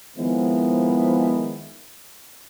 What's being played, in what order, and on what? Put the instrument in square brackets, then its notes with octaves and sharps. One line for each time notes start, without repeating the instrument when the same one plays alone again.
[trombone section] D#3 F3 G#3 B3 C4 E4